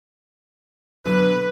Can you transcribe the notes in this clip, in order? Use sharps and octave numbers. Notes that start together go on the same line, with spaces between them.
B2 D3 F#3 B4